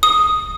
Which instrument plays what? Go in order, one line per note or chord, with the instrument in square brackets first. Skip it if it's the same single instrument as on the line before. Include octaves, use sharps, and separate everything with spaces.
[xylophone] D#6